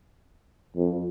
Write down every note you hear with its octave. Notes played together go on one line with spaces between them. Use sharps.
F2